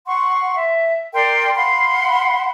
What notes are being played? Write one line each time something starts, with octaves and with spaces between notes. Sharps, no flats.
F#5 C6 C#6
E5
A#4 D5 G5 C6
F5 F#5 B5 C6